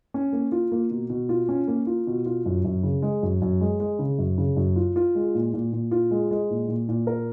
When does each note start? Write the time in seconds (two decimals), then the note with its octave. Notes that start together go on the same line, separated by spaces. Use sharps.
0.14 C#4
0.33 A#3
0.52 F4
0.72 A#3
0.91 B2
1.10 B2
1.29 F4
1.49 C#4
1.68 A#3
1.87 F4
2.07 B2
2.26 F4
2.46 F#2
2.64 F#2
2.83 C#3
3.02 G#3
3.23 F#2
3.42 F#2
3.61 G#3
3.80 G#3
3.99 C#3
4.19 F#2
4.38 C#3
4.57 F#2
4.76 F4
4.96 F4
5.15 G#3
5.35 A#2
5.54 A#2
5.73 A#2
5.91 F4
6.11 G#3
6.31 G#3
6.50 A#2
6.69 A#2
6.89 A#2
7.07 A#4